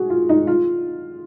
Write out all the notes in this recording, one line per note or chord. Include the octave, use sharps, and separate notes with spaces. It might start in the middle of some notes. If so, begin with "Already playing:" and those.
Already playing: F#4 G#4
F4
D#4
F4